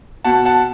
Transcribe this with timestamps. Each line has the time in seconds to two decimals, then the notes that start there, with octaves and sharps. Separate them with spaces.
0.24 B2 F#5 A5
0.45 F#5 A5